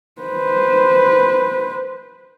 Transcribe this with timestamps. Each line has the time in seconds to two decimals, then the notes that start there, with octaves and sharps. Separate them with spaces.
0.22 B4 C5